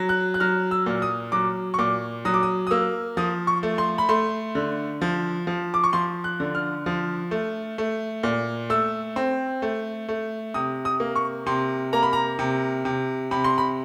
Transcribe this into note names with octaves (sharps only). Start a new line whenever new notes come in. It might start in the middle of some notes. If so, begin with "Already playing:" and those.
Already playing: F#3
F#6
F#6
F#3 F6
E6
A#2
D#6
F#3 D6
C#6
A#2 D6
F#3 D#6
D6
D#6
D#6
A#3 E6
F3 D#6
C#6
A3
C6
B5
A3 C6
D3
F3
F3
D6
C#6
F3 C6
F#6
D3
F6
F3
A3
A3
A#2
A3 E6
C4
A3
A3
C3 D#6
D#6
A#3
C#6
C3 C6
A#3 A#5
B5
A#5
C3
C3
C3 B5
C6
B5